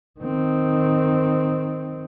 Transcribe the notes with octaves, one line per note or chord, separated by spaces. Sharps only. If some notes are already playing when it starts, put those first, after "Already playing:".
D#3 C4